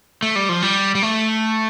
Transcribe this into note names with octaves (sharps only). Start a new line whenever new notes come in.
A3
G3
F3
G3
G3
A3